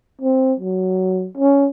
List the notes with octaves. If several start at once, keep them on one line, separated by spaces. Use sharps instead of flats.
C4
F#3
C#4